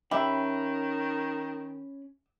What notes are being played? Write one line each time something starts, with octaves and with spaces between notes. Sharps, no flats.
D#3 C#4 G4 E5 B5